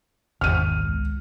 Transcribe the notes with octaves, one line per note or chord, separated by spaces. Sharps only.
G#1 E2 F6 D#7
C#2